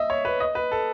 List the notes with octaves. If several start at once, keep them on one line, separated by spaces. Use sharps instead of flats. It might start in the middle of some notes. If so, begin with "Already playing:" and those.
Already playing: D#5 E5
C#5
B4
D#5
B4
A4